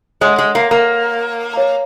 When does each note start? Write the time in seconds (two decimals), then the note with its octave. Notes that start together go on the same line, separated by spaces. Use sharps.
0.21 G#3 C#5 F#5 C6
0.38 G#3
0.55 A#3
0.71 A#3
1.53 C#5 F5 A#5